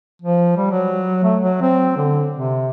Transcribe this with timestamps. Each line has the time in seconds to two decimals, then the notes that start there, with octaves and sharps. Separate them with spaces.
0.22 F3
0.57 G3
0.71 F#3
1.24 A3
1.41 F#3
1.61 C4
1.97 D3
2.36 C3